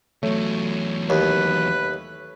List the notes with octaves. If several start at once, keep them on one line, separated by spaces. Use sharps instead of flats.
E2 F#3 A3 C#5
D#2 B4